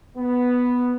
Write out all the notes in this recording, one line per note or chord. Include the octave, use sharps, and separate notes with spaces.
B3